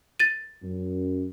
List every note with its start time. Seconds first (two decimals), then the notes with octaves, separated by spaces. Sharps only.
0.20 A6 D#7
0.63 F#2